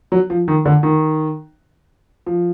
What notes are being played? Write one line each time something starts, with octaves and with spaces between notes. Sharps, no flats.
F#3
F3
D#3
D3
D#3
F3